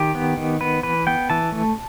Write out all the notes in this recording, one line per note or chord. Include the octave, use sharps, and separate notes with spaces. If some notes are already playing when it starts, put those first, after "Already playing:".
Already playing: D#3 G4
B3
D#3
B3 B4
E3 B4
B3 G5
E3 A5
A3